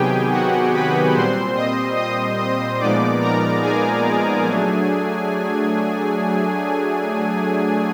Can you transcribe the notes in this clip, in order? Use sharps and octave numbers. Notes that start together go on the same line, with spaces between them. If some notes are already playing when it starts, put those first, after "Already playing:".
Already playing: C3 D#3 F#3 B3 G4 G#4 G5 G#5
F#4 F#5
B4 B5
A#2 G3 C4 C5 C6
D#5 D#6
D#5 D#6
D#5 D#6
A#2 F3 G#3 B3 D#4 D5 D6
A#4 A#5
G#4 G#5
F#3 A3 D4